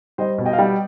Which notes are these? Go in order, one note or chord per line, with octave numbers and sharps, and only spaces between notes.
G3 C5 D#5
B2
D#5 G5
F5
G3 D#5 G5